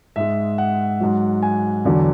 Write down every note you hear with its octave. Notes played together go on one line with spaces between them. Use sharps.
G#2 G#3 E5
F#5
G#2 F#3
G#5
E2 D3 F#3